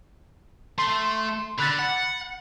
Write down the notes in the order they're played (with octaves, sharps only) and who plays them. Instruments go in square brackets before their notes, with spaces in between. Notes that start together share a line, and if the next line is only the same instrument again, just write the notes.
[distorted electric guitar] A3 [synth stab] C6
[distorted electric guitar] D3 [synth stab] B5 F#6 A6
[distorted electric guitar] F#5